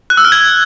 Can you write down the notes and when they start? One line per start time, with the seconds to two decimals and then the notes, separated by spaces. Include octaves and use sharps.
0.10 F#6
0.17 E6
0.25 F6
0.32 G#6